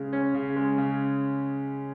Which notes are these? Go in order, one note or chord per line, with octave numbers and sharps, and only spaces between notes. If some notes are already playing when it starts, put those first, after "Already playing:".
Already playing: C#3 G#3
C#4
C#3
G#3
C#3